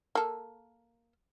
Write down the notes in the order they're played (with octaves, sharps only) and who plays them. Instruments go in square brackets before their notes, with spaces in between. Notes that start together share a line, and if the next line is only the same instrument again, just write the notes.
[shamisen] A#3 A4